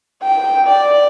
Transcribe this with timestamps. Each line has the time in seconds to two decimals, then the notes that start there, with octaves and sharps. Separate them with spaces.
0.23 G5
0.67 D5